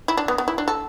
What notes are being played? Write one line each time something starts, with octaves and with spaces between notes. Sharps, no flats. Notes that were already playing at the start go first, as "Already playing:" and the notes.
E4
D4
B3
B3
E4
D4
A4